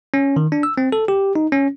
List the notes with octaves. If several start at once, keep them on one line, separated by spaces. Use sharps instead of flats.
C#4
D#3
D4
E6
C4
A4
G4
D#4
C#4